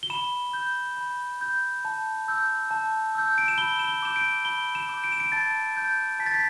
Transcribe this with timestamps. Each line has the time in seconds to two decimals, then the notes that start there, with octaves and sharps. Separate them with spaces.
0.03 G7
0.10 B5 E7
0.53 G6
0.97 B5
1.41 G6
1.85 A5
2.28 E6 G6
2.71 A5
3.15 E6 G6
3.38 D7
3.48 E7
3.58 B5 G7
3.79 E7
3.88 G7
4.02 D6 G6 E7
4.16 D7
4.45 B5 G7
4.75 E7
4.89 D6 G6
5.04 D7
5.12 E7
5.20 D7
5.32 A5 A6
5.77 G6
6.19 A5 B6
6.26 A6
6.34 B6